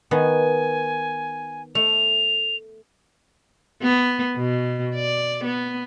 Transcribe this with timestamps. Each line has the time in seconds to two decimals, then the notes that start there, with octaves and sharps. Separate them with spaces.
0.11 D#3 B3 G#5
1.75 A3 F7
3.82 B3
4.37 B2
4.95 D5
5.44 B3